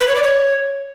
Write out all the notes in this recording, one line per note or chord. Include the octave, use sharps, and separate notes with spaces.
B4
C#5
D5
C#5